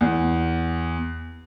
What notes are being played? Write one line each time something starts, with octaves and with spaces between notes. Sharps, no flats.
E2